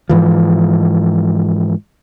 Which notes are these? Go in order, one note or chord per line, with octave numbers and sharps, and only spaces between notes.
G#2 E3 F3